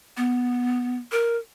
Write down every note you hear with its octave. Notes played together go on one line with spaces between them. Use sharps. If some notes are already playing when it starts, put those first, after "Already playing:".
B3
A#4